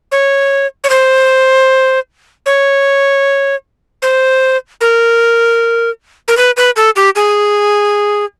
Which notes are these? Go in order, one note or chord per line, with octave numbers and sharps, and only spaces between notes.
C#5
C#5
C5
C#5
C5
A#4
A#4
B4
B4
A4
G4
G#4